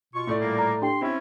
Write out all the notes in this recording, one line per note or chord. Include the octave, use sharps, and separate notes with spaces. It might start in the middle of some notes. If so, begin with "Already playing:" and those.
B2 F4 C#6
A2 A3 D5
A#2 G3 A#3
A#5
D4 G4 G5 C6
C4 C#4 E4 E5